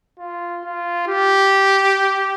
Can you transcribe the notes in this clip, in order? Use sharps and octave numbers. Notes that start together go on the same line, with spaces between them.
F4
F4
G4